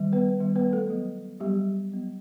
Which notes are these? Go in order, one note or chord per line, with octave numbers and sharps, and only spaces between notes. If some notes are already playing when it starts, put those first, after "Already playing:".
Already playing: D#3 G3
B3 B4
D#3 G3 B3
B3 B4
A3 A4
F#3 B3
F#3 G3 B3 G4
F#3 B3